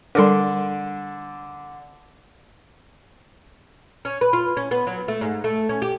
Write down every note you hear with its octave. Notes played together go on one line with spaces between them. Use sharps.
D3 G3 D4 A4 A#4 C6
C#4
B4
F4
C#4
B3
F#3
A3
G#2
A3
C#4
G4